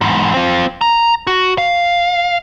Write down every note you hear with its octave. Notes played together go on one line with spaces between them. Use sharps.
E2 G#2
C4 F4
A#5
F#4
F5